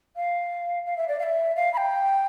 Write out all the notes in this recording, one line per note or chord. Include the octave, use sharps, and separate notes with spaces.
F5
F5
E5
D5
F5
E5
F5
B5
G5